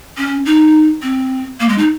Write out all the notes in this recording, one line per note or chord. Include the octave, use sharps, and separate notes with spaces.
C#4
D#4
C4
A#3
G#3
D#4